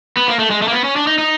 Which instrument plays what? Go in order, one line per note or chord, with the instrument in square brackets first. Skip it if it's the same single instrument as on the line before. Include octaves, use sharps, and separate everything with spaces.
[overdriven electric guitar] B3
A#3
A3
G#3
A3
A#3
B3
C#4
D4
D#4
D#4